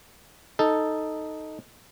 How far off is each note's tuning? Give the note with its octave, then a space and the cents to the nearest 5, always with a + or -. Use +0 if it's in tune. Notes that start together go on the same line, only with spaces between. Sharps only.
D#4 +0 A4 +0